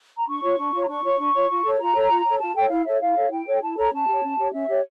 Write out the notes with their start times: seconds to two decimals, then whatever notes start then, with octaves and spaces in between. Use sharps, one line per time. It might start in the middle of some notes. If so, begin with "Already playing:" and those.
0.18 A#5
0.28 D4 C#6
0.42 F4 C#5
0.58 D4
0.72 F4 C#5
0.83 A#5
0.88 D4 C#6
1.03 F4 C#5
1.18 D4
1.34 F4 C#5
1.49 F4
1.64 A4 C#5
1.79 F4 A#5
1.95 A4 C#5
2.09 F4
2.25 A4 C#5
2.40 F4 A5
2.55 A4 C#5 G5
2.70 E4 F5
2.86 A4 C#5 E5
3.01 E4 F5
3.16 A4 C#5
3.31 E4 G5
3.47 A4 C#5
3.62 E4 A5
3.76 A4 C#5 A#5
3.92 C#4 A5
4.08 G4 C#5
4.22 C#4
4.38 G4 C#5
4.52 C#4 E5
4.68 G4 C#5